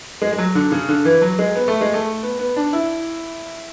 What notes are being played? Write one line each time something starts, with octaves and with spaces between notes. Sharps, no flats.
G#3
G#3
F#3
D3
C#3
D3
E3
F#3
G#3
B3
A3
G#3
A3
B3
B3
D4
E4